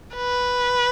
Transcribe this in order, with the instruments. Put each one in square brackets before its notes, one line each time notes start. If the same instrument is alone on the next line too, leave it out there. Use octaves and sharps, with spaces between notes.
[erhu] B4